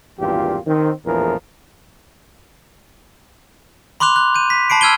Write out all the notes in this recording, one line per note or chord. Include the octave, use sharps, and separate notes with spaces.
G#1 E2 G2 A#2 F4 G4
D#3 C4
A#1 E2 A2 F3 A#4
B5 C6 D6 F#6 F7
F#6
G6 D#7
B6
A5 B5 C7 D7
A5 E6 F6 G#6 D#7 G7